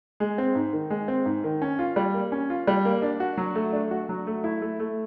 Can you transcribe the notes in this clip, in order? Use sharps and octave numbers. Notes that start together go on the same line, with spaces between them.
G#3
C4
G#2
D#3
G#3
C4
G#2
D#3
C#4
F4
G3
A#3
C#4
F4
G3
A#3
D4
F#4
F#3
A3
D4
F#4
F#3
A3
E4
A3
A3